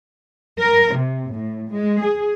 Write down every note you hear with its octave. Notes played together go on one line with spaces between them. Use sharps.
A#4
C3
A2
G#3
G#4